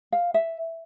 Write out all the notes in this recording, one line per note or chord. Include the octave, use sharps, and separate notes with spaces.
F5
E5